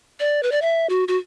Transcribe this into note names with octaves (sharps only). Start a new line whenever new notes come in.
D5
B4
D5
E5
F#4
F#4